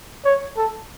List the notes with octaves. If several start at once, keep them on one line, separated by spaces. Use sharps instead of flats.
C#5
A4